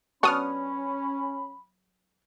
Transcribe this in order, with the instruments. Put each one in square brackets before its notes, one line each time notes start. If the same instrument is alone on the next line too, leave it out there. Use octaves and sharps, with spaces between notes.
[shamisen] F#3 B3 D4 [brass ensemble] C#4 [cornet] B5 [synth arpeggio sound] C#6 D#6 F6